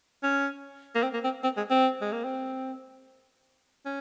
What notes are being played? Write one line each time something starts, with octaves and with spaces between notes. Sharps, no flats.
C#4
A#3
C4
A#3
C4
C4
G#3
C4
G#3
A#3
C4
C#4